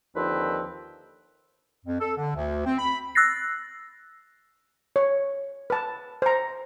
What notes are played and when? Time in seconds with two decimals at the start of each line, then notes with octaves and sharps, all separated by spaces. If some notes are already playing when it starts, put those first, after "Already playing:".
0.16 D#2 D3 D#3 F3 C4 B4
1.86 F2
2.01 A4
2.17 D3
2.35 D2
2.66 C4
2.79 B5
3.15 E6 F#6 A6 A#6 C7
4.96 C#5
5.70 B4 A5
6.22 C5 A#5